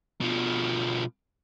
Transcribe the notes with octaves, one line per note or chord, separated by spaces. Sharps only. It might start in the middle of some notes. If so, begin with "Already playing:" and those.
B2 F3